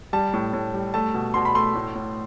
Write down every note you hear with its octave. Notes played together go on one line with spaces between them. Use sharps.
G3 A5
A2
A2
G3
A3 A5
B2
B2 C6
B5
A3 C6
A2
A2